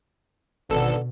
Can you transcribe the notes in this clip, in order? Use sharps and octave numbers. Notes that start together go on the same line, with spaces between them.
G#1 B2 D3 B3 A4